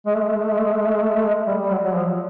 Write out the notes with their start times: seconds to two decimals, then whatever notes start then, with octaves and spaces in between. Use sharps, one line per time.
0.06 G#3
0.14 A3
0.20 G#3
0.28 A3
0.35 G#3
0.43 A3
0.50 G#3
0.58 A3
0.64 G#3
0.72 A3
0.79 G#3
0.86 A3
0.93 G#3
1.01 A3
1.08 G#3
1.15 A3
1.24 G#3
1.47 G3
1.62 G3
1.70 F#3
1.84 F#3
1.94 F3